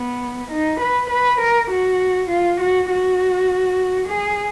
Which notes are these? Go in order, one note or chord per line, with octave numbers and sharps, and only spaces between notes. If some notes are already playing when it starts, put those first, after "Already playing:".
Already playing: B3
D#4
B4
B4
A#4
F#4
F4
F#4
F#4
G#4